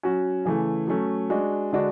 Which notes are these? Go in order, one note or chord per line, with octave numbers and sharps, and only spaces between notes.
F#3 C#4 F#4
C#3 E3 A3
F#3 A3 C#4
G#3 D4 F#4
D3 G#3 D4 F#4